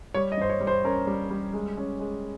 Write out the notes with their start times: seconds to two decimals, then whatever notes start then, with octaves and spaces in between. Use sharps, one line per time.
0.14 G3 C#5
0.32 D#5
0.37 G2 C5
0.49 C#5
0.60 G3
0.67 C5
0.84 C#4 A#4
1.07 G3
1.30 G3
1.53 G#3
1.77 C#4
2.00 G#3